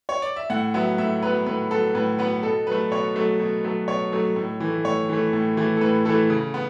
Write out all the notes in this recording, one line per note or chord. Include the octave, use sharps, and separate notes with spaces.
C#5
D5
E5
A2 F#5
F#3 B3 E5
A2 E5
F#3 B3 B4
A2 B4
F#3 B3 A4
A2 B4
F#3 B3 B4
B2 A4
F#3 A3 B4
B2 C#5
F#3 A3
B2
F#3 A3
B2 C#5
F#3 A3
A2
E3 A3
A2 C#5
E3 A3
A2
E3 A3
A4
A2 B4
E3 A3 A4
C#3
B3